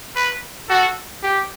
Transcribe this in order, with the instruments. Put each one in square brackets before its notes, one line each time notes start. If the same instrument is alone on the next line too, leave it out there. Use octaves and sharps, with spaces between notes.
[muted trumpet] B4
[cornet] F#4 [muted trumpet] A4
[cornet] G4